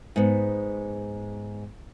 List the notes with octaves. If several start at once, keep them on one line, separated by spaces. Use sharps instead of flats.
G#2 B3